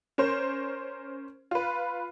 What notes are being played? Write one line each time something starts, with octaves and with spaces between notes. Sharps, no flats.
C#4 A#4 C5
F4 B4